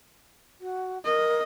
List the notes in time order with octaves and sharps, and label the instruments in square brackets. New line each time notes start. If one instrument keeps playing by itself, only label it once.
[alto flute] F#4
[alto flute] A#4 [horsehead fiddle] D#5